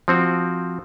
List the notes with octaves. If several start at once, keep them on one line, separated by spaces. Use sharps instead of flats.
F3 C4 F#4